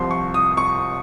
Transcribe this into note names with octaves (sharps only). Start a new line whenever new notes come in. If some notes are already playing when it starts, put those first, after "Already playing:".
Already playing: C2 C3 F3 C6
C#6
D#6
C#6